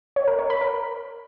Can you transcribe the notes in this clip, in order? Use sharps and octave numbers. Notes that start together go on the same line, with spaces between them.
C#5
A#4
C#5
B5
A#4